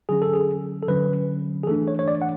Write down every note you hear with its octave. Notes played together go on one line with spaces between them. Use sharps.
D3 F#3 C#4 G#4
A4
G#4
A4
D3 F#3 C#4 B4
G#4
E3 A3 D4 A4
C#5
C#5
D5
F#5